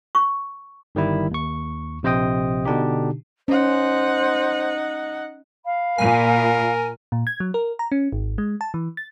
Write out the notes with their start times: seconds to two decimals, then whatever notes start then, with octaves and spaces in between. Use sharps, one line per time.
0.15 C#6
0.95 G1 D#3 G3 E4
1.31 D#2 C#6
2.03 A#1 C3 C5 D#5 G5 D#6
2.65 B2 D3 D4 D#4 G4
3.48 C#4 D#4 C5 F#5
5.65 F5 B5
5.98 A#2 A#4 G#5
7.12 A#2
7.27 G#6
7.40 F#3
7.54 A#4
7.79 A#5
7.92 C#4
8.12 G#1
8.38 G#3
8.61 A5
8.74 E3
8.97 A6